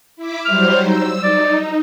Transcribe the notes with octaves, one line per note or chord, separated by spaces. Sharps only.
E4 E5 D6
F#3 G3 C5 F6
D#4 E6
D#4 D5